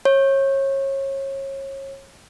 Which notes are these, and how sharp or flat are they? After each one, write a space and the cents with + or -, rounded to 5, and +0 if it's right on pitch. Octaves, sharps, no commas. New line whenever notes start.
C#5 -30